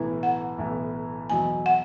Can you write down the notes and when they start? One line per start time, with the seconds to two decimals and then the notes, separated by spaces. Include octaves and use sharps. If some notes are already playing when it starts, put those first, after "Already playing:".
Already playing: B1 A2 E3 B3 E4
0.23 F#5
0.58 B1 A2 E3 B3 E4
1.30 E2 B2 F#3 G#5
1.66 F#5